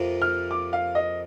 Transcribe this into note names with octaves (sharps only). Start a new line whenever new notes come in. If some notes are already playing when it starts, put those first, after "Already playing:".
Already playing: F2 C3 F3 A#3
F6
D6
F5
D#5